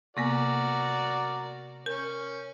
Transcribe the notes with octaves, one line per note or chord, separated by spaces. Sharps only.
C3 A#3 B3 F#4 A#4 D5
C#4 A#4